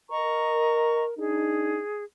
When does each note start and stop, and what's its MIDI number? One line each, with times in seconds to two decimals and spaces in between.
0.11 1.13 70
0.11 1.04 75
0.11 1.04 82
0.11 1.04 85
1.18 1.79 62
1.18 1.79 63
1.18 2.03 68